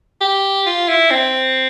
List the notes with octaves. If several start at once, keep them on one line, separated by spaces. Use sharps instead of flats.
G4
F4
E4
C4